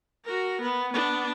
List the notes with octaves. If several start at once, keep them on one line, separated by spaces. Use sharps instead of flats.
F#4 A#4
B3
B3 D4